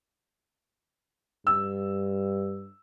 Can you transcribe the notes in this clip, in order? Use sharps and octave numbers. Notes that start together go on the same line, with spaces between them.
G2 E6